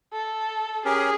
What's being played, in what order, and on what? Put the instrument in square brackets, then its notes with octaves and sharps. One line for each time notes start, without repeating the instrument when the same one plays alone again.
[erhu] A4
[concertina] C#4 G4 A#4 [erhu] G#4